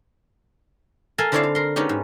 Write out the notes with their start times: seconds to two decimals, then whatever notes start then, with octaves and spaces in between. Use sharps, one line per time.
1.18 A4 A#4 F5 G#5 A5
1.32 D3 C4 E4 C#5 D5 F5
1.43 F5
1.55 A#4 C6
1.76 G#3 B3 C#4 D#4 G4
1.89 G#2